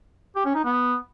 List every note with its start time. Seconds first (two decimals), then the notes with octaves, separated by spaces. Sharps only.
0.36 G4
0.45 C#4
0.55 D#4
0.65 B3